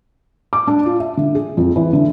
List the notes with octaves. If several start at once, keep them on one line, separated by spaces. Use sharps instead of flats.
D6
D4
F4
E5
D3
G#4
F2
E3
D3